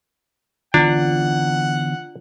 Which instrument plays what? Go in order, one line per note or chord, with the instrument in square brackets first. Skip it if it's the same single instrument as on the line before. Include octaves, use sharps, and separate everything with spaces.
[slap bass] D3 E3 B3 [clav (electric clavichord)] D4 [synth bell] F4 [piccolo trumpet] F#5